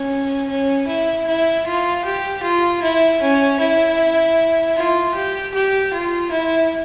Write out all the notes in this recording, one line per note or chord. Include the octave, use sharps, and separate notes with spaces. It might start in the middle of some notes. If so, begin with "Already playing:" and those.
Already playing: C#4
C#4
E4
E4
F4
G4
F4
E4
C#4
E4
F4
G4
G4
F4
E4